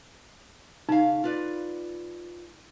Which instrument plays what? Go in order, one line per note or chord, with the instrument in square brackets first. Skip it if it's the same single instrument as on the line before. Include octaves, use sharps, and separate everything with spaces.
[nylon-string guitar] C#3 F5 [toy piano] D#4
[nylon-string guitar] F4 B4 D5